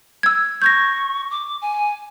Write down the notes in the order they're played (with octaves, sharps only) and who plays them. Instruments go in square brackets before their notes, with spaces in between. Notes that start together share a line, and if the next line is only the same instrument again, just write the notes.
[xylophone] E6 G#6
[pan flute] C#6 [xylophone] G6 G#6 A#6
[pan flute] D6
G#5